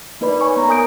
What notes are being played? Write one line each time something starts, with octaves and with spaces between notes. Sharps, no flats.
A#3 D#4 B4 D5 B5
C#5 G#5 C#6
B3 A#5
A#4 G#5 D#6 G6 D7